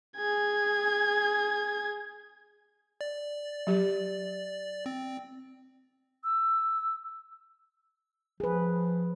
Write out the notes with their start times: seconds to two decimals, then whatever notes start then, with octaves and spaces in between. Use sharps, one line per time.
0.17 G#4 G#6
3.01 D5
3.67 F#3 G4
4.86 C4
6.24 E6
8.40 F3 G#4 B4